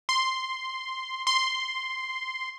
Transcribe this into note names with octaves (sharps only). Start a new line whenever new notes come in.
C6
C6